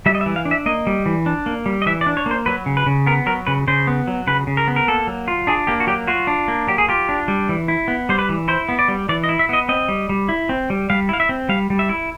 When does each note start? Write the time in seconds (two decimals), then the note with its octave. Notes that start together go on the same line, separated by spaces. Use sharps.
0.06 G3 E5
0.15 D#5
0.21 E5
0.26 E3
0.36 F5
0.45 D4
0.51 E5
0.66 A#3 D#5
0.87 G3
1.06 E3
1.26 D4
1.46 A#3
1.66 G3
1.82 D#5
1.86 E3 E5
2.01 D5
2.06 D4
2.17 C#5
2.26 A#3
2.31 C5
2.46 F#3 B4
2.66 C#3
2.77 B4
2.86 C#3
3.07 B3 A#4
3.26 F#3 A#4
3.47 C#3 B4
3.67 C#3 C5
3.87 B3
4.07 F#3
4.27 C#3 B4
4.47 C#3
4.57 A#4
4.68 B3
4.76 A#4
4.88 A#3 A4
5.07 F#3
5.28 F4
5.47 D4 G#4
5.67 A#3 G4
5.80 F#4
5.87 F#3 G4
6.08 F4 F#4
6.27 D4
6.48 A#3
6.67 F#3 G4
6.78 G#4
6.88 F4 G4
7.09 D4
7.28 G3
7.49 E3
7.68 E4
7.88 B3
8.09 G3 C5
8.19 B4
8.29 E3
8.48 E4 C5
8.69 B3
8.79 D5
8.88 G3
9.09 E3 D5
9.24 D#5
9.29 E4
9.39 E5
9.49 B3 D#5
9.69 C4 D#5
9.88 G3
10.09 G3
10.29 E4
10.49 C4
10.70 G3
10.90 G3 F5
11.09 E4 F5
11.20 E5
11.29 C4
11.49 G3 F5
11.70 G3
11.79 E5
11.89 E4